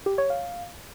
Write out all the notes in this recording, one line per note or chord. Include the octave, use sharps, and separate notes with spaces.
G4
C#5
F5